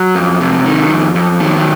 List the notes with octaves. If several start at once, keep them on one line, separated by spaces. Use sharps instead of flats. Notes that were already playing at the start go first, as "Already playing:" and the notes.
Already playing: F#3
F2
C3
D#3
F2
F2
D#3 F#3
F#3